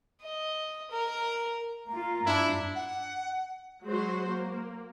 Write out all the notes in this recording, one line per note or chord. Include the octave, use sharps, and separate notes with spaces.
D#5
A#4
A#3 F4 A#5
G2 D4 E4
F#5
F#3 G#3 F#4 C5
A#3